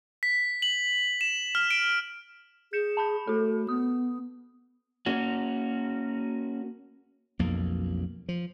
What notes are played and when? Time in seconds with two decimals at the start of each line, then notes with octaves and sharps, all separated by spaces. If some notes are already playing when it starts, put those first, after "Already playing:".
0.23 B6
0.62 F#7
1.21 E7
1.55 F6
1.71 D7
2.73 G#4 G6 C#7 E7
2.97 A5 B5 G6
3.27 A3 F#4 A4
3.69 B3 D#6
5.06 A#3 C#4 F#4
7.39 B1 F2 A#3
8.29 F3